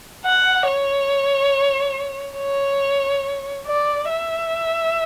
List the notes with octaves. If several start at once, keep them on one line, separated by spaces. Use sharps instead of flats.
F#5
C#5
C#5
D5
E5